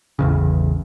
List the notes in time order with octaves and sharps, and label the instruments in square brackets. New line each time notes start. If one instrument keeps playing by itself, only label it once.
[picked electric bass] A1 E2 C#3